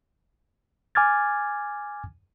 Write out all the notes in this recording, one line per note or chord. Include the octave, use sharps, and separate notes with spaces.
G#5 D6 F6 G#6 A6